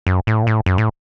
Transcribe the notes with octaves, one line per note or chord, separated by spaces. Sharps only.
F#2
A2
A#2
A2
F#2
A2